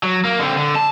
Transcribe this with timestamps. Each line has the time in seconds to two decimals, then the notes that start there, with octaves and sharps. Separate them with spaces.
0.03 F#3
0.25 A#3
0.39 D3 C4
0.57 D3
0.76 A5